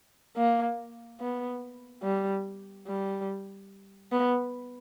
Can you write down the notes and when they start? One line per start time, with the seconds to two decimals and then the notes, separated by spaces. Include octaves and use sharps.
0.37 A#3
1.20 B3
2.03 G3
2.87 G3
4.12 B3